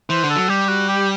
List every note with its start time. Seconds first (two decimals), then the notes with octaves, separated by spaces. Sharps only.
0.09 E3 C5
0.23 D3
0.30 A4
0.36 F#3
0.49 G3 G4
0.69 F#4
0.89 G4